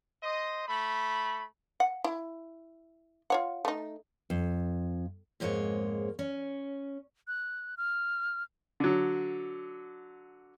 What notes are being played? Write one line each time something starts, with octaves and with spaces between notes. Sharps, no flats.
C5 D#5
A3 B5
F#5
E4
F4 C#5 F#5
A3 D#4
F2
F2 G#2 G#3 A#3 C#5
C#4
F#6
F6
D3 F#3